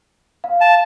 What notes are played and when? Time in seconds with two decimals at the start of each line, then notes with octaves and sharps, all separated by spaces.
0.44 F5
0.61 A5